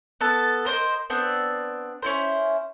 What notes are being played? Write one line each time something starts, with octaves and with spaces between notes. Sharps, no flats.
B3 A4 A5
A#4 C5 C#5 D#5
B3 C4 D4
C#4 E4 C5